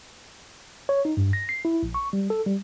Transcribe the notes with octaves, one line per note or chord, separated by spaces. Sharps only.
C#5
D#4
G2
A#6
C7
E4
A#1
C#6
G3
A4
G3